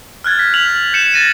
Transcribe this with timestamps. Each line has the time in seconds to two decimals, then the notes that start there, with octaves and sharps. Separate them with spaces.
0.24 F6 F#6 G#6 A6
0.39 B6
0.54 F6 B6 F7 F#7
0.93 G6 C#7 E7
1.14 A6 A#6 D#7